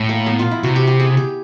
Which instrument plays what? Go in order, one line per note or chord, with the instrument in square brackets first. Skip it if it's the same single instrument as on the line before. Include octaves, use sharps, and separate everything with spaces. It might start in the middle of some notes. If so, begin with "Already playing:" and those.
Already playing: [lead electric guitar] A2
[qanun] A#3
B3
F4
E4
[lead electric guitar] C3 [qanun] F#4
[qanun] G4
G4
G#4
G4